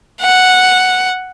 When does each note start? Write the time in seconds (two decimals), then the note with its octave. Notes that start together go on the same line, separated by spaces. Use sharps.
0.22 F#5